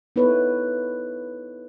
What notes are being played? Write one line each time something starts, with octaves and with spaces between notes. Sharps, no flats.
B3 D#4 E4 A4 B4 C#5